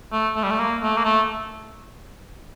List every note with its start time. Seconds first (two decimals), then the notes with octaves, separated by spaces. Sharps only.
0.12 A3
0.36 A3
0.43 G3
0.51 A3
0.59 A#3
0.82 A3
0.97 A#3
1.05 A3